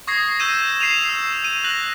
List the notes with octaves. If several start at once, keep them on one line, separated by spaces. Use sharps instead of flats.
C#6 D#6 G#6 A#6 C7
E6 G6 A#6 D#7 E7
C7 D#7 F7
E6
D#7
F#6 A#6 F#7